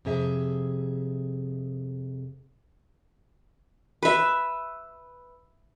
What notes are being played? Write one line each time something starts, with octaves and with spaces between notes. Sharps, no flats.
F2 C3 G#4 E5
B4 E5